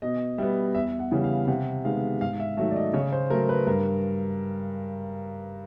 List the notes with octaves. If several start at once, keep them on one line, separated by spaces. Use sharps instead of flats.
B2 D#5
G3 B3 E5
E2 E5
F#5
C#3 E3 G3
F5
C3 F#5
D#3 G#3 B3 F5
G#2 F5
E5
D#3 F#3 A3 E5
D5
D#5
C#3 C#5
C5
F#3 A3 A#4
B4
G2 A#4